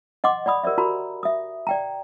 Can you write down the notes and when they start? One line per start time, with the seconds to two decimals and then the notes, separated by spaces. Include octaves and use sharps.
0.24 D#5 F#5 C6 D6
0.46 D5 F#5 B5 D#6
0.64 G4 A#4 C5 D5 E5
0.78 F#4 A#4 A#5 B5
1.23 E5 D#6
1.67 D5 G5 A#5